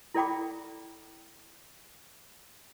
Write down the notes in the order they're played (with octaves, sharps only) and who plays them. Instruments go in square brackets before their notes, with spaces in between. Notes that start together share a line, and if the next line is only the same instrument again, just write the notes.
[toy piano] E4 A4 D5 G5 B5 D6